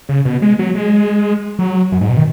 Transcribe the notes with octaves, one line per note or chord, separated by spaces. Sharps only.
C#3
B2
G#3
F#3
G#3
F#3
F#2
G#2
B2
D#3